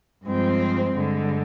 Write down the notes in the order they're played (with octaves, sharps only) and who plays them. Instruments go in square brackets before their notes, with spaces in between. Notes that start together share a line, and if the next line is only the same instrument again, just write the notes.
[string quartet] G2 F3 G#3 C4
C5
G2 D3 G#3